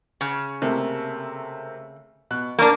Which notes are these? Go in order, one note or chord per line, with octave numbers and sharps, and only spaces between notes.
C#3
C3 A3 A#3
B2 F#6
A#3 D4 A#5 C#6